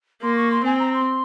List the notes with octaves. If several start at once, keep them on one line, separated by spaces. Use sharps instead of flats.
A#3 C6
C#6
C6
C4 G#5
A#5
C6